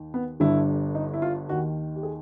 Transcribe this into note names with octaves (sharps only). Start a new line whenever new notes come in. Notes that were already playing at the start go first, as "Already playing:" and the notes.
Already playing: D#2 D#3
B3
G1 G2 D3 E4
D#4
E4
F4
D#2 D#3 F#4
G4
G#4